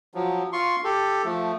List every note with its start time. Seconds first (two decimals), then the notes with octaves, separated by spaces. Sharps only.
0.14 F3 F#3
0.53 F4 C6 C#6
0.84 G4 A4
1.25 F3 A3